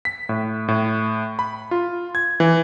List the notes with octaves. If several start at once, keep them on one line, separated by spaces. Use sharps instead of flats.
B6
A2
A2
B5
F4
G#6
E3